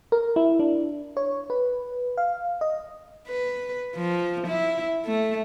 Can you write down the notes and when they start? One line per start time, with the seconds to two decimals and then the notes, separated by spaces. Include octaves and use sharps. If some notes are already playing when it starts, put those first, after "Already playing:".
0.12 A#4
0.36 E4
0.59 D4
1.17 C#5
1.50 B4
2.18 F5
2.61 D#5
3.28 B4
3.96 F3
4.48 E4
5.06 A3